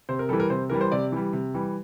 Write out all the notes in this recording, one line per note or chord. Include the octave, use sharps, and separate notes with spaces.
C3 C5
A#4
E3 G3 A4
A#4
C3 C5
E3 G3 A#4
C5
C3 D5
E3 G3
C3
E3 G3